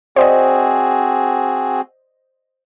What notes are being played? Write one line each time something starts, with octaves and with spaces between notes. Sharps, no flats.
C4 F#4 G#4 C5 D5 D#5